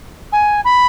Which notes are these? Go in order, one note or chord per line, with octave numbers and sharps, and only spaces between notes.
G#5
B5